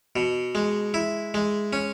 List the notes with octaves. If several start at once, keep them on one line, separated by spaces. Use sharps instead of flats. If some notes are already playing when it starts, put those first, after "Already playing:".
B2
G#3
E4
G#3
C#4